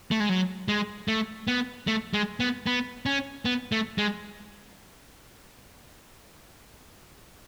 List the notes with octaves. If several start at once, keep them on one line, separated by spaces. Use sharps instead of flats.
A3
G#3
F#3
G#3
A3
B3
A3
G#3
B3
B3
C#4
B3
A3
G#3